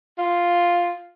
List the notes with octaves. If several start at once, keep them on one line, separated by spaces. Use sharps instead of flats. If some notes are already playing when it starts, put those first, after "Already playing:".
F4